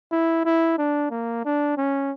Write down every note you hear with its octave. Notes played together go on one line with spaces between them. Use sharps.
E4
E4
D4
A#3
D4
C#4